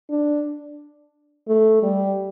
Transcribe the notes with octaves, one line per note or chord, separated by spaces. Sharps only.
D4
A3
G3